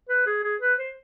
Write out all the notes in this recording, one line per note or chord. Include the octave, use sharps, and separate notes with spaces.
B4
G#4
G#4
B4
C5